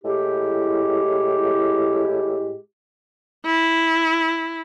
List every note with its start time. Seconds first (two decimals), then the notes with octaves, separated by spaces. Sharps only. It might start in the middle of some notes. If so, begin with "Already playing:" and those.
0.04 A2 G#3 E4 G4
3.46 E4